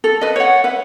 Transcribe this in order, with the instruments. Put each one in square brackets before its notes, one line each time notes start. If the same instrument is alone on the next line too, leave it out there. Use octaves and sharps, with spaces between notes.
[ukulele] A4
B4 D#5
C#5 F#5
B4 E5